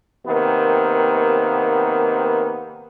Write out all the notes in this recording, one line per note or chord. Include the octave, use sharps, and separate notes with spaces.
C3 D#3 A#3 B3